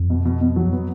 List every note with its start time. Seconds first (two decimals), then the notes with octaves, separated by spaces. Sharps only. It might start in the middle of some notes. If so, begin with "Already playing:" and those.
Already playing: F2
0.10 B2
0.25 B2
0.41 B2
0.56 F#3
0.72 B3